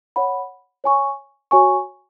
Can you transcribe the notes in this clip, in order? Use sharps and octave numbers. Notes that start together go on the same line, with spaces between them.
C#5 F#5 B5
C#5 G#5 C#6
F#4 C#5 G#5 C#6